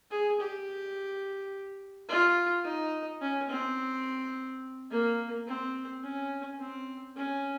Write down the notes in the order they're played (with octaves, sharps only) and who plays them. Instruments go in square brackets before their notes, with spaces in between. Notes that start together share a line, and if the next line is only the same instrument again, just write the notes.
[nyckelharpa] G#4
G4
F4
D#4
C#4
C4
A#3
C4
C#4
C4
C#4